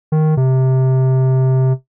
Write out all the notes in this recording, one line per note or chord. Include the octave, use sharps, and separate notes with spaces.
D#3
C3